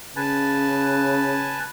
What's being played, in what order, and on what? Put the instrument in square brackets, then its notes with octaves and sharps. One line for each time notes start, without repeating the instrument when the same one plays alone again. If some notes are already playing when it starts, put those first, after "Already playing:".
[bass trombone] C#3 [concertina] B4 G#5 A5